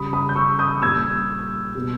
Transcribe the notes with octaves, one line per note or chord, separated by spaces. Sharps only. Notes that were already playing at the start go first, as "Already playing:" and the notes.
Already playing: C#3 G3 B5 D#6
B5 D#6
G6
C#6 E6
D#6 G6
A#2 G3 E6 G#6
B2 G3